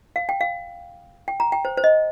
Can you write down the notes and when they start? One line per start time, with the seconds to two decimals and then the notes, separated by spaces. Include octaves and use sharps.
0.16 F5
0.29 G5
0.41 F5
1.28 G5
1.40 A#5
1.52 G5
1.65 C5
1.77 C5
1.84 D#5